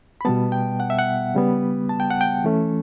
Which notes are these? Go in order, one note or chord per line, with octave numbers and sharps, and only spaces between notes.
B5
B2 G3 B3 A5
G5
F#5
E5
F#5
C#3 G3 B3
A5
G5
F#5
G5
E3 A3 C#4